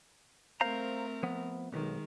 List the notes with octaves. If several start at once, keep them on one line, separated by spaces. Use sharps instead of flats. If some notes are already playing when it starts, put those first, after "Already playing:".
A3 C4 A#4 C5 F5 A#5
F3 B3
B1 D#3 G#3